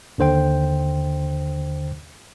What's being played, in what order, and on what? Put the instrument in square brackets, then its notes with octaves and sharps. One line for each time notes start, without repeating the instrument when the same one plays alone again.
[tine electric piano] D#2 D3 C5 G5